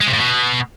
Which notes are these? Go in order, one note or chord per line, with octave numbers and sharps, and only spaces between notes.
G#3
C3
A2
B2